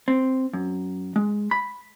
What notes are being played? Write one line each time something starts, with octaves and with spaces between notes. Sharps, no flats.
C4
F#2
G#3
B5